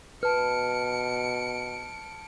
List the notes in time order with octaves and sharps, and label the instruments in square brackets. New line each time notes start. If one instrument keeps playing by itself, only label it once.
[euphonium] B2 [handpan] B4 [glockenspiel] A5 F6 [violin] C#7 D7